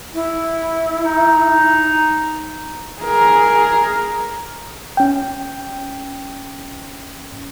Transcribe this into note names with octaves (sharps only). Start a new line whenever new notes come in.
E4
D#4
G#4 A#4
C#4 G5